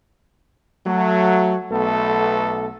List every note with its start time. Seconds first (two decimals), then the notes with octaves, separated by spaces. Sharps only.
0.86 F#3 A3
1.72 B1 A3 B3 A4